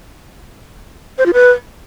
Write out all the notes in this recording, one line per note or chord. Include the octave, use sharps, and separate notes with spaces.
C5
F4
B4